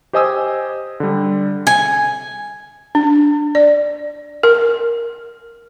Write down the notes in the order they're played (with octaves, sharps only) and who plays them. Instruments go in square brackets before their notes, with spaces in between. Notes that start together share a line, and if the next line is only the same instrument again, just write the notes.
[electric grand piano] G4 C5 D#5 G#5 D#6 E6
D3 G3
[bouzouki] G#5
[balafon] D4
D5
A#4